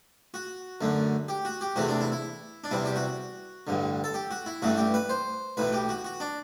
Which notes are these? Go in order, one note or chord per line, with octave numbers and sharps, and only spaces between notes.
F#4
F#2 D3 A3
G4
F#4
G4
E2 C3 E3 A3 F#4
D4
E4
E4
D4
E2 C3 G3 E4
G4
F#4
A1 G2 D3
A4
G4
F#4
E4
A1 G2 E3 A3 F#4
G4
B4
C5
B1 A2 E3 B4
G4
F#4
F#4
D4